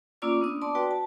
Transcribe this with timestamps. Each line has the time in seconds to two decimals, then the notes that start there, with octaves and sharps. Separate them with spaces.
0.22 A#3 C#4 F4 D5 D6 E6
0.41 B3 D4 D#6
0.62 D5 A5 C6 D6
0.75 F#4 B4 D5 G5
0.91 A5